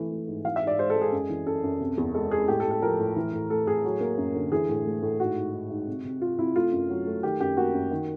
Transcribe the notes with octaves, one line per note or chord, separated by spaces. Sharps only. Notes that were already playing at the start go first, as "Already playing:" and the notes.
Already playing: E3 A3
A3
G#2
E3 F5
E5
G#2 D5
G#3 C5
A4
G#3
G#4
F#2
E3
F#2 A4
F#2
C3
E2
G#3 A4
G#3 G#4
A2 G4
A4
A2
A4
F3 A#4
A2
E3
A2
A3 A4
A2 G#4
F#3
A#3
F#2
D3
E3 G#4
A2
A3
A2
G#2 F#4
G#2
G#2
G#2
C3
C3
C3 F4
C3 E4
A3 F4
F#2
F#3
A3
D#3 G4
F#2 G4
A#3 F#4
F#2
D#3